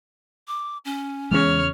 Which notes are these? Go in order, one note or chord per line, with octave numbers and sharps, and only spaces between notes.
D6
C#4
E2 C#3 E3 G#3 C#5 F6